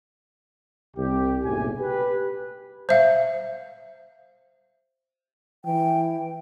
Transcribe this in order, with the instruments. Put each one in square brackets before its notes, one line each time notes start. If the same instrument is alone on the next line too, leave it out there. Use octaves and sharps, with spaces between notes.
[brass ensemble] C2 G4
F#1 B1 A2 G#5
G4 B4
[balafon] C5 E5 F5
[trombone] E3 [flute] G5